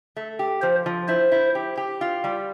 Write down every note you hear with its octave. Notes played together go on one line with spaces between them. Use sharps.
A3
G4
F3 C5
F3
E4 C5
E4
G4
G4
F4
G3